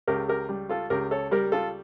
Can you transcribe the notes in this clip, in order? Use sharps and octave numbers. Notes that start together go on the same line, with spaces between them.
C#2 G4 A#4
G4 A#4
G3
F4 A4
C#2 G4 A#4
A4 C#5
G3 G4 A#4
F4 A4